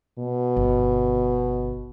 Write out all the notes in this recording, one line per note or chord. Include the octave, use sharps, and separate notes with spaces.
B2
G1